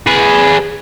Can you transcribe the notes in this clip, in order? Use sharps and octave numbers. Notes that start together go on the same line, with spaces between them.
G#4 B4